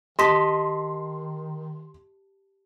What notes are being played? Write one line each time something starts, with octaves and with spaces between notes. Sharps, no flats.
D#3 G4 D#5 A5 C6 B6